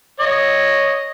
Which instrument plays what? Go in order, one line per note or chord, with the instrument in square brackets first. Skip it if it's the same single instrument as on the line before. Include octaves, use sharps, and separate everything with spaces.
[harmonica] C#5 D#5